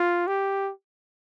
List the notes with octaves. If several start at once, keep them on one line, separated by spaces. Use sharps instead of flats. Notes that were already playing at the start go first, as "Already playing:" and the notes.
Already playing: F4
G4